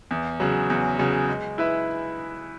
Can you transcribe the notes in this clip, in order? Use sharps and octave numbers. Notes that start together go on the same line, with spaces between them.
E2
C#3 F#3
E2
C#3 F#3
G#3
E4 B4 E5